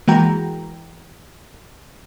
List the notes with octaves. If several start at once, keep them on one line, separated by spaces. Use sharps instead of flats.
E3 G#3 A#3 F#4 G5 A#5